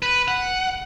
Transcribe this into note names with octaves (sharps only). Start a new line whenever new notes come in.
B4
F#5